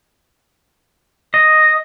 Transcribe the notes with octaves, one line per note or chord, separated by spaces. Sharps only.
D#5